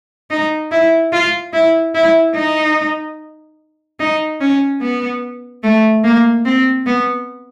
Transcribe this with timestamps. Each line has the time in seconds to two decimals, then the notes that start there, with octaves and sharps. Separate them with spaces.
0.30 D#4
0.71 E4
1.12 F4
1.53 E4
1.95 E4
2.35 D#4
3.99 D#4
4.40 C#4
4.81 B3
5.63 A3
6.04 A#3
6.45 C4
6.86 B3